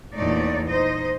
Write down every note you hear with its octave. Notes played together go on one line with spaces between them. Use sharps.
E2 A#2 A3 D#4 C#5 D5
D#4 C5 D#5